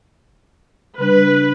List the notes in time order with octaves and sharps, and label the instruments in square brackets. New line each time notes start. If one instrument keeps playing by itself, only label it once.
[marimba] C#3 G3 D4 [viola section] B4